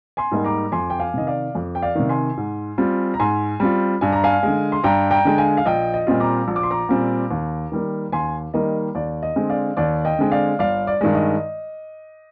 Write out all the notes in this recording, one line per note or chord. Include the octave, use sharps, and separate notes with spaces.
G#5 C6
G#2 G3 A#3 D#4
A#5 D6
F2 G#5 C6
G5
F5 G#5
C3 D#3 D#5
D5 F5
F2
G5
D5 F5
C3 D#3
G#5 C6
G#2
G3 C4 F4
A#5
G#2 G#5 C6
G3 C4 F4
G2 G#5
A#5
F5 G#5
D3 G#3
C6
G2 G5 A#5
G5 A#5
D3 G#3
F5 G#5
F5
A#1 D#5 G5
D#5
A#2 G3 C4 F4
A#5 D6
A#1
D6
C6
A#5 D6
A#2 G3 C4 F4
D#2
D#3 G3 A#3
D#2 G#5 C6
D#3 G3 A#3 D#5
D#2 D5
D#5
D3 G#3 C4
D5 F5
D#2 D5
D#5 G5
D3 G#3 C4
D5 F5
G1 D5 F5
D5
G2 D#3 G#3
D#5